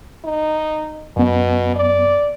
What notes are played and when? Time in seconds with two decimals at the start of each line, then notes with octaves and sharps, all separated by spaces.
0.24 D#4
1.17 F#2 B2 B3
1.76 D5